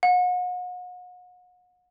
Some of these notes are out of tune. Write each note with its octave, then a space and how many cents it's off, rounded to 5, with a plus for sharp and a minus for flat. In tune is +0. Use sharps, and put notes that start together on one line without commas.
F#5 -40